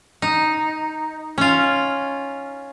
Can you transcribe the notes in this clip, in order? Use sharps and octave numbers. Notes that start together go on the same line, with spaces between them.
D#4
C#4 F4